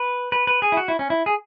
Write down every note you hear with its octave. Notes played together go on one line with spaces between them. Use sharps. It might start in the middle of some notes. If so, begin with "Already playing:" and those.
Already playing: B4
B4
B4
G#4
E4
F#4
E4
C#4
E4
G#4